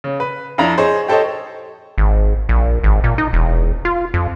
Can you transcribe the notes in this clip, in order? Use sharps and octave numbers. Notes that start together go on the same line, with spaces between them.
C#3
B4
F2 D4 E4 A#5
G#4 C5 C#5 D#5
G4 A4 C5 C#5 D#5
G#1
A#1
G#1
A#2
D#4
E1
F4
F2